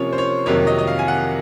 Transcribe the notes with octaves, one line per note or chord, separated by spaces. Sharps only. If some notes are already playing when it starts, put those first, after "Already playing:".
Already playing: C3 F3 A#3 C#4 C#5
C5
C#5
F2 C3 D#3 F#3 A#3 C#5
D#5
D#5
F5
G#5
F#5